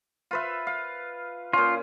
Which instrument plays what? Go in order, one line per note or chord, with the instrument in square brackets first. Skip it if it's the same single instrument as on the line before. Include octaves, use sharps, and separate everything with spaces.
[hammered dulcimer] F4 B4 E5
F5
[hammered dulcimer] A#2 C#4 [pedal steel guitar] F4